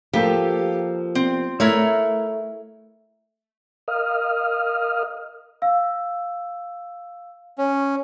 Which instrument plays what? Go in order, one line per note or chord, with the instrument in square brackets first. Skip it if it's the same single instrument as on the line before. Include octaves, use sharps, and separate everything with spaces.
[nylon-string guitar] F3 A#3 A4 [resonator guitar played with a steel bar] G4
[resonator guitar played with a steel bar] C4
[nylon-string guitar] A3 [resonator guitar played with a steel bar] E4 A#4 C#5
[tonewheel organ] A#4 D#5 F5 D#6 F6
[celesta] F5 E6
[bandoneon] C#4